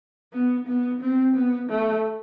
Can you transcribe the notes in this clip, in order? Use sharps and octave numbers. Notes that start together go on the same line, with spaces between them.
B3
B3
C4
B3
A3